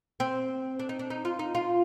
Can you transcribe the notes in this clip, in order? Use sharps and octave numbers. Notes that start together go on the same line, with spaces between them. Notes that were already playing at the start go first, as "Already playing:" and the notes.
C4
D4
D#4
D4
D#4
F4
D#4
F4